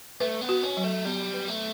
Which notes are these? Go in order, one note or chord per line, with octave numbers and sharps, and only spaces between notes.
A3 B4
B3
F#4
C#4
F#3
A3
G3 B3
B4
A3